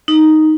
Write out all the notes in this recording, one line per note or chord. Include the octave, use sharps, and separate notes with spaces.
D#4